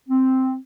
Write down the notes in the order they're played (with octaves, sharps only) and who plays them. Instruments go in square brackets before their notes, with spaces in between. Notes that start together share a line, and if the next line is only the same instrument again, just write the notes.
[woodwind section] C4